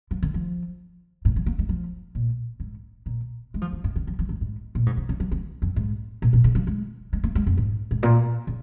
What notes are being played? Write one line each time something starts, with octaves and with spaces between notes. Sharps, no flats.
F3
D#3
F3
G#2
F3
A#3
G#3
F3
A#2
G#2
A#2
G#3
F3
F3
G#2
C#3
F3
F3
G#2
G#2
A#2
G#2
A#2
C#3
F3
C#3
F2
G#2
A#2
A#2
C#3
F3
G#3
G#3
A#3
G#3
F2
G#2
G#2
A#2
C#3